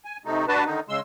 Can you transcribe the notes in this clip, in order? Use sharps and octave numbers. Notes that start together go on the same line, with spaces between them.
G#5
C3 A3 D#4
D4 F#4 B4 A5
D3 D#3 D#4
C#3 G#3 C6 E6